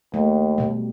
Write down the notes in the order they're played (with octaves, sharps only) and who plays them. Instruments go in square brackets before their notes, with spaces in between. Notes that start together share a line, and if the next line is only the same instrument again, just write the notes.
[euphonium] D#2 [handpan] A3
[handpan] B2 G3